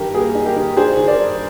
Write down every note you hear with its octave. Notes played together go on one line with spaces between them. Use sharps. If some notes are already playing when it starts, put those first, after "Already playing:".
Already playing: G2 D#3 D#4 G4 A#4
A#3 G#4
D#4
G4 A#4
D#3
D4 G#4 C5
D#3
A#4 D5
G2